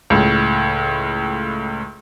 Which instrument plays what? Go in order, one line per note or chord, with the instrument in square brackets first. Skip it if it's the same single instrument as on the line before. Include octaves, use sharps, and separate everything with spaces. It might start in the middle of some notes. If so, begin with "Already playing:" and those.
[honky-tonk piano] C#2 A2